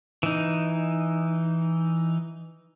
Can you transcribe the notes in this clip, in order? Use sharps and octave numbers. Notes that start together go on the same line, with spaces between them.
E3 D#4